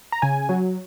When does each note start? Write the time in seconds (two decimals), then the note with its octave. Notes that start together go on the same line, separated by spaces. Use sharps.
0.12 A#5
0.22 C#3 G#5
0.49 F#3